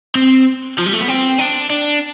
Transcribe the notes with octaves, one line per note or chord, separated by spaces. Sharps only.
C4
F3
G3
A3
B3
C4
D4
D4